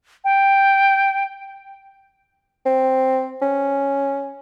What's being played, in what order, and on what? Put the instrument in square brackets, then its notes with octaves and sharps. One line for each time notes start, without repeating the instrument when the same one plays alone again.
[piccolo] G5
[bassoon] C4
C#4